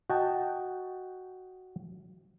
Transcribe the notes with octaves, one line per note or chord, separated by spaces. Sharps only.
F#4 D#5 G5 A5